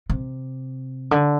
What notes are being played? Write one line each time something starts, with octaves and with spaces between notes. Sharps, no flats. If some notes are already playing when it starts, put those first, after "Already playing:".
C3
D3